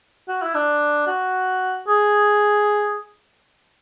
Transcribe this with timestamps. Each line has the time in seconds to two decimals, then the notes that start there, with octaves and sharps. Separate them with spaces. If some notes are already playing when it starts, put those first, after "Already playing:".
0.28 F#4
0.42 E4
0.55 D4
1.07 F#4
1.88 G#4